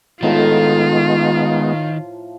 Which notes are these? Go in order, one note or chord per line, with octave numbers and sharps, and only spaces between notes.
A2 D#3 F3 G#3 B3 F4 A#5